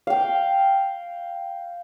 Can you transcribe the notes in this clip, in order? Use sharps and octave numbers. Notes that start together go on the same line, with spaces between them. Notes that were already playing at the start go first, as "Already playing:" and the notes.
F5 G5